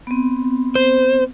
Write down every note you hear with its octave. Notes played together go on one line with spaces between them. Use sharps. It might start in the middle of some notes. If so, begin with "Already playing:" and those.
B3 C4
C5